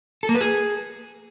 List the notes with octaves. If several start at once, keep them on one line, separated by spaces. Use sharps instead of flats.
A4
A#3
B4
G#4